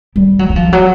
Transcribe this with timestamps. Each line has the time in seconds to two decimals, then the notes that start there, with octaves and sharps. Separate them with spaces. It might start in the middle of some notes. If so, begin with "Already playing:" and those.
0.16 G3
0.39 F#3
0.50 F#3
0.56 F3
0.73 F#3